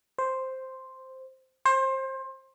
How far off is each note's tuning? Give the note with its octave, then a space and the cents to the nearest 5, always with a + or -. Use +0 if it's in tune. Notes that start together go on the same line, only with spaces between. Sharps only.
C5 +0
C5 +25